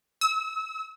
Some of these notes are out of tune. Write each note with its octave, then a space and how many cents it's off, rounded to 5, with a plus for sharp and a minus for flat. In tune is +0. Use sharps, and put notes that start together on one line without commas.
E6 -35